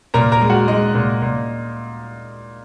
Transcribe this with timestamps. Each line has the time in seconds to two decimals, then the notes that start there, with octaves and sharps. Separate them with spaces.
0.14 A#2 A#4 A#5
0.32 A#4 A#5
0.41 G#3
0.50 F#4 F#5
0.68 G#3 D#4 D#5
0.95 A#2
1.22 A#2